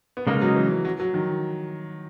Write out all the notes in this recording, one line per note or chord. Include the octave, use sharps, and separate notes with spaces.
B3
C#3 G#3 A#3 D#4 A#4
F#3
E3
F#3
F#3
D#3